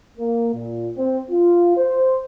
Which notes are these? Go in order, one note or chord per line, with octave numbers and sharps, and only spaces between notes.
A#3
A#2
C4
F4
C5